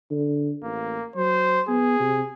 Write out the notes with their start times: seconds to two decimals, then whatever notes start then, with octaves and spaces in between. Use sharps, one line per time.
0.11 D3
0.63 A1 A#3
1.16 F#3 C5
1.68 B3 G#4
2.00 C3